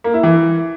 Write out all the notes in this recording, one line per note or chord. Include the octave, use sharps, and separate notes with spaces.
A#3
E4
E3